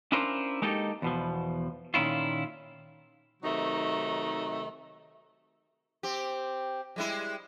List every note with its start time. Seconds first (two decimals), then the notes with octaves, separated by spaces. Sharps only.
0.12 C#4 D4 E4 F4 A#4 C5
0.62 G#3 A#3 D#4 G4 A4
1.02 E2 B2 F3
1.94 A#2 D#3 C#4 E4 F4
3.42 C3 D#3 F#3 A3 D#4
6.03 C4 G4
6.96 G3 G#3 E4